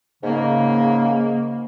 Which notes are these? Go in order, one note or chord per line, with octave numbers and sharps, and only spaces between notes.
G#2 C#3 A#3